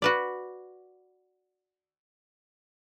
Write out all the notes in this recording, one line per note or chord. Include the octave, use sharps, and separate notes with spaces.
F#4 B4 D5